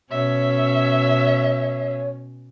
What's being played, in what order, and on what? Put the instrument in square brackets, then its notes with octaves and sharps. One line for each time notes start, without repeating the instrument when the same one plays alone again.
[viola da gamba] B2 C#4 [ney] C#5 [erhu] E5